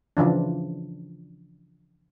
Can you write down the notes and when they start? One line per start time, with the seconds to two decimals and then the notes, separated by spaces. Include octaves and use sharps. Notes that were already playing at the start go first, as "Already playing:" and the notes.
0.17 C#3 E3 F3 D4